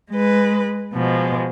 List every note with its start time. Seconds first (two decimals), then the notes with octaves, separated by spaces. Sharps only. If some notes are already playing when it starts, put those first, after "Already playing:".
0.12 G#3 B4
0.94 B2 F3 G#3